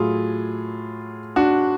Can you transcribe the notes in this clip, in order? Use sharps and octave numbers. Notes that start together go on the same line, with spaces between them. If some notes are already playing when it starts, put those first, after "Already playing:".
Already playing: A2 F#3 A3 F4 G#4
D4 F#4